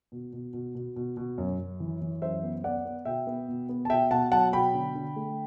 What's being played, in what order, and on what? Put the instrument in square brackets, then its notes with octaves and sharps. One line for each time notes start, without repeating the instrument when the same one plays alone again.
[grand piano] B2
B2
B2
B2
B2
B2
F#2
F#2
E3
E3
F#2 C5 E5
B3
B3 D5 F#5
B3
B2 E5 G5
B3
B2
B3
A5
B2 E5 G5
B2 F#5 A5
F#3 F#5 A5
B2 G5 B5
D3
D3
A3